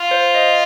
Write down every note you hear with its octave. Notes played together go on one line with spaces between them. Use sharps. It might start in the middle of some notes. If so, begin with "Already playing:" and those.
Already playing: F4
C5
D#5